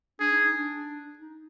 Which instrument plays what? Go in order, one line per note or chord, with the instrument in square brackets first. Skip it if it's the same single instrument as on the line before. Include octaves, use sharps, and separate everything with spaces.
[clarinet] D4 [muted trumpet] G#4
[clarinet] D#4
D#4
D4
D#4